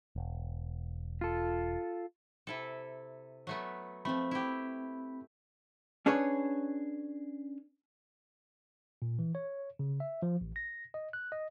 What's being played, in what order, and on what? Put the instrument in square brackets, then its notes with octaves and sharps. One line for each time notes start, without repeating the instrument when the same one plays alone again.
[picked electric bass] E1
[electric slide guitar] F4 A4
[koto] C3 E4 A4
F#3 A3 B3
[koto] F3 A3 [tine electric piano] C4 B5
[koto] E4 G4
[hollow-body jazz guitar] C#4 D4 G#4 B4 C#5
[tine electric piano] A#2
E3
C#5
C#3
E5
F3
A1
A#6
D#5
F#6
D#5